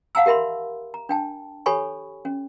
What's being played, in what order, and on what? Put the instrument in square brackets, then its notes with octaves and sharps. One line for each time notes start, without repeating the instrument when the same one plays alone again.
[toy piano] F5 F#5 A5 A#5 E6
G4 A#4 E5 B5 C6
A#5
D4 G5 A5
G4 A4 C#5 G#5 B5 C#6
C#4